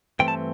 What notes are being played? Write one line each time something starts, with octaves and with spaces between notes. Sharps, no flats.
G2 E3 A3 C4 G5
A5